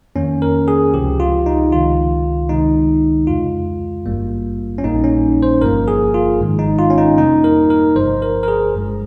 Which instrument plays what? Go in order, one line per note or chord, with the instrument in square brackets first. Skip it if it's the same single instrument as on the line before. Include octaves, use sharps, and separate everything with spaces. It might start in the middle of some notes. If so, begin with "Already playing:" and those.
[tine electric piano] F2 D#3 A#3 C#4
A#4
G#4
C#2 C3 F3 G4
F4
D#4
C#2 C3 D#3 F4
C#2 C3 D#3 G#3 D#4
F2 C#3 G#3 F4
G#1 G2 G3 A#3
C#4
A#1 A#2 G3 A#3 D#4
C#4
C5
G1 G2 F3 A#3 A#4
G#4
F4
G#1 G#2 D#3 G#3
D#4
F4
C#4
D#4
F2 C3 G3 A#3 D#4
A#4
A#4
G1 G2 F3 C5
A#4
A#4
G#4
G1 G2 F3 G#3